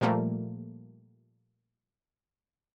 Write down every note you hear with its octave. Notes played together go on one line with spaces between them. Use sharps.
A#2 F3 G3 A3 A#3